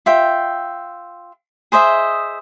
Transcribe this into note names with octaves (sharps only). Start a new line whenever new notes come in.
F4 E5 G5
G#4 C5 D#5 E5